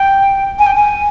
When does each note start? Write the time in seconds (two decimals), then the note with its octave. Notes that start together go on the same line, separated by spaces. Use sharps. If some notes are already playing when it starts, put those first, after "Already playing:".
Already playing: G5
0.59 G#5
0.67 G5
0.75 G#5